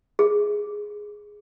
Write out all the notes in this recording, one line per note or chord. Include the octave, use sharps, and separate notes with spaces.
G#4